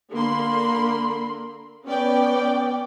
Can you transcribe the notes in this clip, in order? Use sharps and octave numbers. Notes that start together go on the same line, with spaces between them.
D3 A#3 A#4 B5 C6
B3 C#4 D5 G5